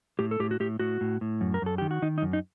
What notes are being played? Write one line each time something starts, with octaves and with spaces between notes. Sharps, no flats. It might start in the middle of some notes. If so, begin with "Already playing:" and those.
A2 G4
A4
A2 G4
F#4
A2 G4
A2 F#4
A2
A2
F#2
A#4
F#2 A4
D#3 G4
F#4
D#3 D#4
D#4
F#2
D#4